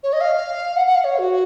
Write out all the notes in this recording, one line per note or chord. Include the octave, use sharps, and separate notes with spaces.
C#5
D#5
F5
F#5
F#5
F5
C#5
F#4